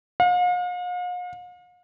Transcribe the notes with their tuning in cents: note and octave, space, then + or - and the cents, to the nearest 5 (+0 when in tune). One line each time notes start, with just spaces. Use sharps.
F5 +45